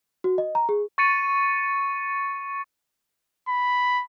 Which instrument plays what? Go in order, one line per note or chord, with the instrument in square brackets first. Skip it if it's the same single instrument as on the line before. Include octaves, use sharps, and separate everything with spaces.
[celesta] F#4
D#5
A#5
G#4
[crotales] C#6 A6 C#7 D#7
[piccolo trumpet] B5